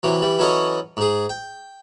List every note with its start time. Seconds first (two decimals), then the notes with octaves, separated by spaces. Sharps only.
0.03 C3 E3 F#3
0.22 E3 G3
0.39 E3 F#3 C#4 F#4 A4 D#5
0.97 G#2 G#4
1.29 G5